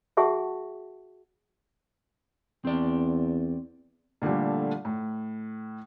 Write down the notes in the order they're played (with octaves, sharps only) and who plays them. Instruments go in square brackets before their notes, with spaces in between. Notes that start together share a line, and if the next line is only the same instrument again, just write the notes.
[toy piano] F#4 G#4 E5 F#5 A5 C#6
[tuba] E2 [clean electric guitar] C4 D5
[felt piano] A#2 D3 F3 G3 A3
A2